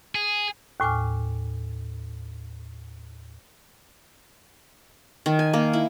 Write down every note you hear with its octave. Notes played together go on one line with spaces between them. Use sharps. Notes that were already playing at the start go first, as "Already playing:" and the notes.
G#4
D#2 A2 G#5 D6 F6
D#3
G#5
A#3
E4